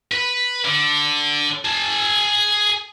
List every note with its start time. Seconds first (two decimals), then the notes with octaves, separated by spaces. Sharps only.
0.12 B4
0.65 D3
1.65 G#4 A5